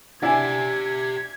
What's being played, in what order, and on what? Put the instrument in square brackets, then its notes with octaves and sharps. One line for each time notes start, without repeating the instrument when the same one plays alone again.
[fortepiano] D4 E4 [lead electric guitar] G4 E5 [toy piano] F#5 G#5 [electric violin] G#6